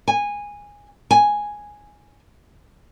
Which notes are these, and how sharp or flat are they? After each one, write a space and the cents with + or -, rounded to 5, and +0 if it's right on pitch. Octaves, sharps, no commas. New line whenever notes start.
G#5 -15
G#5 +0